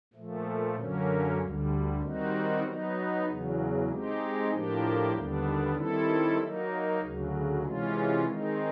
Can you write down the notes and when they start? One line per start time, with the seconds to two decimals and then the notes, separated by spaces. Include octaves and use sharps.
0.13 A#2 F3 A3
0.76 F#2 D3 F#3 A#3 C#4
1.38 D2 D3 G3
2.01 D#3 G3 C4 D#4 F#4
2.63 F#3 B3 D#4
3.26 E2 C#3 F#3
3.88 G#3 C4 D#4 G4
4.50 A2 F3 A#3 D4 G4
5.13 D#2 D3 G3 B3 D4
5.76 D#3 G3 C4 E4 A4
6.38 F#3 A#3 D#4
7.00 D2 C#3 F#3
7.62 C3 E3 G#3 C#4 F4
8.25 D#3 G#3 C4 D#4